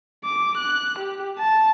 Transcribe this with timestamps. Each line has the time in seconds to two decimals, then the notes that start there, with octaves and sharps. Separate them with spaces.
0.25 D6
0.58 F#6
0.99 G4
1.38 A5